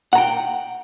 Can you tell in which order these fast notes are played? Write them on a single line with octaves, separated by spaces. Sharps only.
F#5 A#5 G5